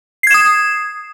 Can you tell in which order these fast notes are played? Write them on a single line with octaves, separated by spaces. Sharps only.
C7 G#6 E7 D#6